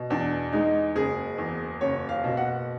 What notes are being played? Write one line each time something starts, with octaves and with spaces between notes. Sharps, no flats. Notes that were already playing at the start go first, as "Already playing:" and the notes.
Already playing: B2
E2 D4
G#3 D#4
F#1 G#4
E2
F#1 C#5
F5
B2
F#5